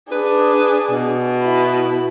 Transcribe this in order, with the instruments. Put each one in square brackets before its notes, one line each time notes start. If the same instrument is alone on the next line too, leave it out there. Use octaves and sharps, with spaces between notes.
[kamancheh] D4 G#4 [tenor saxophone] B4
[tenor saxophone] B2
[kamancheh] E4 B5